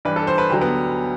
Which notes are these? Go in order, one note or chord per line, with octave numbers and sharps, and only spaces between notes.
G2 E3 G3 B4
A4
C5
B4
D2 D3 F#3 G4
B3